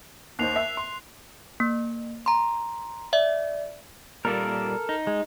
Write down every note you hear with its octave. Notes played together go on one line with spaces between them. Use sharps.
D#2 D#4 C5 F#6 C7 F7
E5
C6
A#3
A#5 C6
D5 E5
A#2 G3 A#3 A4 A#4
D#4
G#3